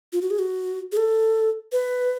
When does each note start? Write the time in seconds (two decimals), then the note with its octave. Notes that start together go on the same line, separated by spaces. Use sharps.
0.13 F4
0.22 F#4
0.31 G#4
0.39 F#4
0.92 G#4
0.97 A4
1.72 B4